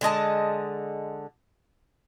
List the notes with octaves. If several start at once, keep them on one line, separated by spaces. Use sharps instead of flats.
D3 G#3 D#5 A5